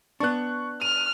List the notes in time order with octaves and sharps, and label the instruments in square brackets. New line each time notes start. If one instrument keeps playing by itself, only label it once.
[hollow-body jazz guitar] B3 D4 [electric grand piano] C#6 F#6
[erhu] F6 [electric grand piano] D#7